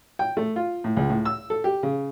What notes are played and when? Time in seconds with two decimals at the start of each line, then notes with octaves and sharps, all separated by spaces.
0.19 G5
0.37 A3
0.56 F4
0.84 A2
0.97 C#2
1.10 A2
1.25 E6
1.50 A4
1.64 G4
1.83 C#3